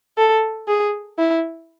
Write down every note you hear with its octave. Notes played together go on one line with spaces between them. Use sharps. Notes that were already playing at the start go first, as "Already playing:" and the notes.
A4
G#4
E4